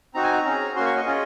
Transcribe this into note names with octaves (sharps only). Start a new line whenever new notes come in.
C4 D#4 F#4 A#5
G#5
A#5
C#4 G#4
A#3 C#4 F#4 C6
C#6
D#5
C#4 F4 G#4